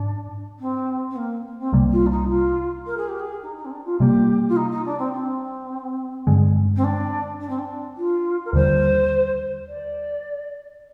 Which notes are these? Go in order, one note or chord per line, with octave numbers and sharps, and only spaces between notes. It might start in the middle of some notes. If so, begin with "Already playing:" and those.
Already playing: G#2 D4
C4
C4
A#3
A#3
C4
C2 C3 G3 A#3
F4
D4
D#4
F4
A#4
G#4
G4
G#4
D#4
D#4
C4
D4
F4
C3 G3 A#3 G4
F4
D#4
D#4
D4
C4
C4
G2 D3 G#3
C4
D4
D4
C4
D4
F4
A#4
D#2 D3 G3 C5
D5